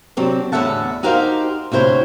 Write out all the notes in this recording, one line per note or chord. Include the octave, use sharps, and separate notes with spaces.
C3 F#3 C4 D4
E2 A2 D3 E5 F#5 A5
D#4 F#4 G4 A#4 C5 F5
D2 C3 E4 C5 C#5